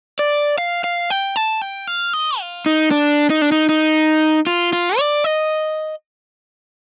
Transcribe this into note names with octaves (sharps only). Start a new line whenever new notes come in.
D5
F5
F5
G5
A5
G5
F5
D#5
F4
D#4
D4
D#4
D4
D#4
D#4
F4
F4
D5
D#5